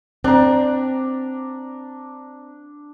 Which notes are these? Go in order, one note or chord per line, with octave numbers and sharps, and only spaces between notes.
C4 D4 A#5